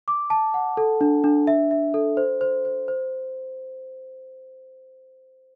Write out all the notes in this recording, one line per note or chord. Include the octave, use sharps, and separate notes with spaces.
D6
A5
F#5
A4
D4
D4
E5
E5
A4
C5
C5
C5
C5